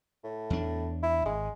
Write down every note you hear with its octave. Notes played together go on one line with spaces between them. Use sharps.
A2
E2 D4
E4
G#1 G#3